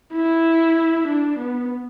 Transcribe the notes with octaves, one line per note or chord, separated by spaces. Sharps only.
E4
D4
B3